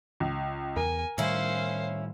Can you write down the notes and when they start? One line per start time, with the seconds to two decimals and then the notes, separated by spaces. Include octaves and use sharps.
0.20 C#2
0.76 E2 A#4 G#5
1.18 A2 D#3 G3 C#4 E4 C5 F5